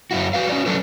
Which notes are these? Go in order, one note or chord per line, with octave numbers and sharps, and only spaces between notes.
F#2 E4 F#4
F#4 B4 F5
C#4 F#4 D5
F#3 C#4 D4 A4 B4